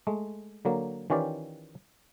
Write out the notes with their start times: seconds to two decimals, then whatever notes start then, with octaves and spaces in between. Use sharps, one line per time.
0.07 G#3 A3
0.65 D3 F#3 A#3
1.10 D#3 E3 C#4 F4 G4 D5